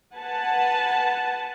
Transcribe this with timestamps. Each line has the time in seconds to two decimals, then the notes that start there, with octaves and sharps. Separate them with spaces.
0.17 B4 F#5 G#5 A5